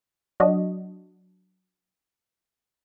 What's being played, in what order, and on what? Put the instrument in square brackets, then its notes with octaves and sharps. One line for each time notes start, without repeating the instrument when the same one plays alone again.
[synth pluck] F#3 D4 F#4 D#5